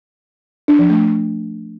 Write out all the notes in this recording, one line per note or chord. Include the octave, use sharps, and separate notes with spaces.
D4
F3
A3